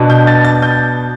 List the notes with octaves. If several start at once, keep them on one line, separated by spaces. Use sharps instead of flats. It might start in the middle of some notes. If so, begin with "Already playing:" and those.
Already playing: B2 B3 D4
G6
A6
A6
G6